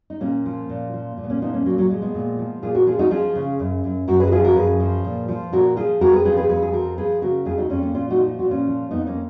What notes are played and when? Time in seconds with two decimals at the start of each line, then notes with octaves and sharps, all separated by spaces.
0.10 D#4
0.21 A#2 A#3 C#4
0.45 F3
0.69 A#2
0.94 F3
1.17 A#2
1.24 B3
1.30 A#3 C#4
1.42 F3 B3 D#4
1.54 A#3 C#4
1.66 A#2 F#3 A#3
1.78 F#3
1.90 F3 G#3
2.02 G#3 B3
2.14 A#2
2.39 F3
2.63 A#2 F4 G#4
2.75 F#4 A#4
2.86 F3 F4 G#4
2.99 D#4 F#4
3.11 F3 F4 G#4
3.35 C#3
3.59 F#2
3.84 F#2
4.08 F#2 F#4 A#4
4.20 G#4 B4
4.27 F#4
4.32 F3 F4 G#4
4.44 F#4 A#4
4.56 F#2 G#4 B4
4.80 F3
5.05 A#2
5.28 F3
5.52 A#2 F#4 A#4
5.76 F3 F4 G#4
6.01 F2 F#4 A#4
6.13 G#4 B4
6.25 F3 G#4 B4
6.37 G#4 B4
6.49 F2 G#4 B4
6.63 G#4
6.73 F3 F#4 A#4
6.98 F3 G#4 B4
7.22 C#3 F#4 A#4
7.45 F2 F4 G#4
7.58 D#4 F#4
7.70 F2 C#4 F4
7.82 A#3 C#4
7.94 A#2 C#4 F4
8.10 D#4 F#4
8.18 F3
8.27 F4
8.39 A#2 F#4
8.51 C#4 F4
8.67 F3
8.91 F2 B3 D#4
9.07 A#3 C#4